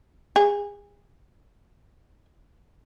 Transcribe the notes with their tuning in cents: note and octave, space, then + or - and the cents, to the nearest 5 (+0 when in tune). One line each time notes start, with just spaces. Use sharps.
G#4 -30